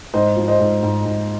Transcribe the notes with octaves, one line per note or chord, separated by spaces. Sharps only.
G#2 C5 D#5
F3
C5 D#5
G#2
G#2
G#2